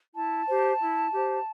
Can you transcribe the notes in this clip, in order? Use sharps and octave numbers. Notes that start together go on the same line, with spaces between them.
E4 A5
G4 C5
E4
G4 C5